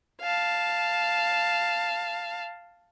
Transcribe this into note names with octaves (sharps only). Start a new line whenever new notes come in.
F5 A5